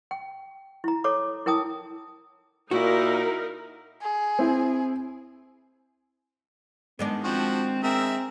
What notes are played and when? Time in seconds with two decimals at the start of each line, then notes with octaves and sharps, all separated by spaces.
0.11 G5
0.84 E4 A#5
1.04 A4 C#5 A#5 D6
1.46 E4 A#4 G5 A5 D#6
2.71 A#2 D#4 E4 F#4 A#4
4.02 G#4
4.39 C4 E4
6.99 D#3 G#3 B3 D4
7.24 F3 C4 F#4
7.83 C4 G#4 A#4 E5